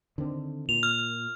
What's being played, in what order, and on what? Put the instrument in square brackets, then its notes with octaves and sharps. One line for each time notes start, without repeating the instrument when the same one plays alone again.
[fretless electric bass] D3 D#3 C4
[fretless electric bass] A#2 [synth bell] F7
[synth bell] F6